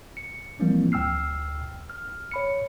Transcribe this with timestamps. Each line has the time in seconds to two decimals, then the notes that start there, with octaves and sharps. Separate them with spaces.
0.17 C#7
0.59 E3 F3 G3 A#3 C4 E4
0.92 D2 G5 E6 F6 C7
1.90 F6
2.31 C#5 B5 C#7